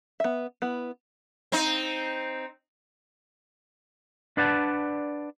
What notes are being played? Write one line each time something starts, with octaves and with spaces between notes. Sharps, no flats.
B3 E5
B3 E4
C4 D#4
D4 B4 D5 F#5 A5